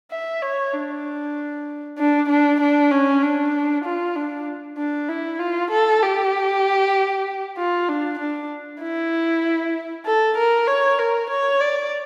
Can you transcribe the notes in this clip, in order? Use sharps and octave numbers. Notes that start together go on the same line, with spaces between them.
E5
C#5
D4
D4
D4
D4
C#4
D4
F4
D4
D4
E4
F4
A4
G4
F4
D4
D4
E4
A4
A#4
C#5
A#4
C#5
D5